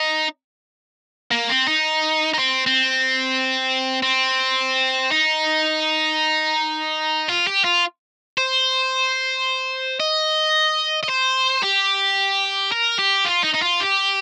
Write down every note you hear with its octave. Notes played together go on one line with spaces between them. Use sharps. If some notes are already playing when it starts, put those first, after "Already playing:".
Already playing: D#4
A#3
C4
D#4
D#4
C4
C4
C4
D#4
F4
G4
F4
C5
D#5
D#5
C5
G4
A#4
G4
F4
D#4
D#4
F4
G4